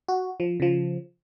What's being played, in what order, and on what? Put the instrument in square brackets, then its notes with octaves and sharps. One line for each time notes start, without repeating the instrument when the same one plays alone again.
[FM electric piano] F#4
F3
C#3 F3